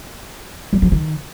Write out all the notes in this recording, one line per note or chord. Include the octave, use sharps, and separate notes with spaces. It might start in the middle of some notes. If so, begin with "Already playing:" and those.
G3
F3
D#3